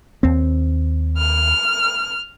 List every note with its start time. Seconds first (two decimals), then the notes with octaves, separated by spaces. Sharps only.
0.23 D#2 C4
1.18 F6